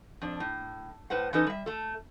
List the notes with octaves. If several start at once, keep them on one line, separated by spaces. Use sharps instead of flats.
F2 D4
A2
A2 B4 C5 F#5
E3 C#4 D#4 A4 B4 D#5
G3 E5
A3 A4